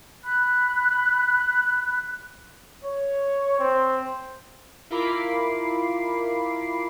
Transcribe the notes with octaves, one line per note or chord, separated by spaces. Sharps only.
B5 F#6
C#5
C4
E4 F4 A#4 B5 D6 C7